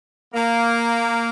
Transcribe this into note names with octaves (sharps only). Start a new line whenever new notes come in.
A#3